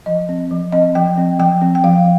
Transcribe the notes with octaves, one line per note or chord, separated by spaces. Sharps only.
F3 D#5
C4
F3
C4 D#5
F3 G5
C4
F3 G5
C4
G5
F3 F5